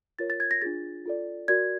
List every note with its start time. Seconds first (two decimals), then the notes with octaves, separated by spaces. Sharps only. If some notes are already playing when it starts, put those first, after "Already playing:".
0.19 F4 A#4 C#5 A6
0.30 A6
0.40 G#6
0.51 A#6
0.62 D4 F4 G#4 A6
1.06 F4 A4 D5
1.48 F#4 A#4 D5 G#6